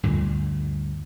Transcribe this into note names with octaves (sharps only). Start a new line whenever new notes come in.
D2 G2 A#2 D3